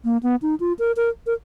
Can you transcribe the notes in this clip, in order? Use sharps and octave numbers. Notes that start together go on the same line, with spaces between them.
A#3
B3
D#4
F4
A#4
A#4
A#4